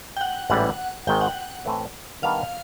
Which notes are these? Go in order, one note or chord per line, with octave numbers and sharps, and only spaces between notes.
G5
F#5
A1 G#2 E3 G3 F#5
G#1 G#2 D#3 G#3 G5
F#5
A2 E3 A3 C4
D#3 G3 B3 D4 F5